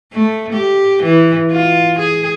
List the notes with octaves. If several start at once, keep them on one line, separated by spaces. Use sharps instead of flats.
A3
G4
E3
F4
G#4